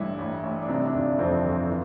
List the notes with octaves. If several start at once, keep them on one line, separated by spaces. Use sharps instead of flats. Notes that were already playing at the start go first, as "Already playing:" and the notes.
Already playing: A1 G2 E4
A1
A1
D4
C3 D#4
D4
G1
F2 C4
G1
E3